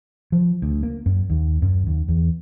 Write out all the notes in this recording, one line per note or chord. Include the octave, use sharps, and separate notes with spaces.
F3
D2
A#3
F#2
D#2
F#2
D#2
E2